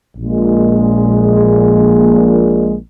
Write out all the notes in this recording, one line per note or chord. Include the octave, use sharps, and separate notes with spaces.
A#1 A#2 G#3